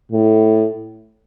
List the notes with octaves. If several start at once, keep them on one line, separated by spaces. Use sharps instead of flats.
A2